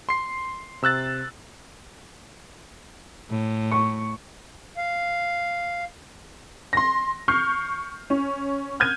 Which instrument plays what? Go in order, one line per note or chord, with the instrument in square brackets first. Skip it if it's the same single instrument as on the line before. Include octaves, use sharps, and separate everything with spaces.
[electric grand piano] C6 C7
C3 E6 F#6 A6
[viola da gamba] A2
[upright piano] C#6
[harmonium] F5
[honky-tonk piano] C6 A#6
C#6 F6 G6 C7
C#4
F6 G6 G#6 D#7